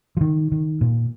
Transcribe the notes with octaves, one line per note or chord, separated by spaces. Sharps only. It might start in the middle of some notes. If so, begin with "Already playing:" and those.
F3
D#3
D#3
A#2